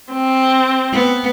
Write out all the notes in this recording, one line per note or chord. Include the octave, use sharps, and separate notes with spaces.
C4
B3